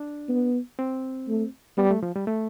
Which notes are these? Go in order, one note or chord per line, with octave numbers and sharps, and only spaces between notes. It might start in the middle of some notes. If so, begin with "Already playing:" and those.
Already playing: D4
B3
C4
A3
G3 B3
A3
F3
G3
A3